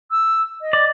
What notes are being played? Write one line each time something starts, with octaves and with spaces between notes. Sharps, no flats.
E6
D#5
D5